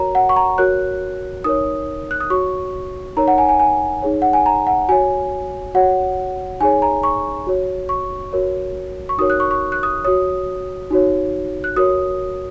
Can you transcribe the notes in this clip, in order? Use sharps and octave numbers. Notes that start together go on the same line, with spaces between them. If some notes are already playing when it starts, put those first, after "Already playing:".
Already playing: F#4 A#4 C#5 A#5
F#5
C#6
A#5
F#4 A#4 C#5 F#6
D#4 A#4 C#5 D#6
F#6
D#6
F#4 C#5 C#6
D#4 A#4 C#5 A#5
F#5
G#5
G#5
G#5
D#4 G#4 C#5
F#5
G#5
A#5
F#5
F#4 C#5 G#5
F#4 C#5 F#5
D#4 G#4 C#5 G#5
A#5
C#6
F#4 C#5
C#6
F#4 A#4 C#5
C#6
D#4 F#4 A#4 C#5 D#6
F#6
C#6
C#6
F#6
D#6
F#4 C#5 D#6
D#4 F#4 C#5
F#6
F#4 A#4 C#5 D#6